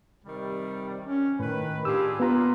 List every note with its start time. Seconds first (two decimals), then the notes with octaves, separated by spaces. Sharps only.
0.25 C3 D#3 G3
1.07 C#4
1.40 A2 D#3 B4
1.85 D4 F4 G4 G#4 E6
2.20 A#2 B3 F4 B4 A#5 B5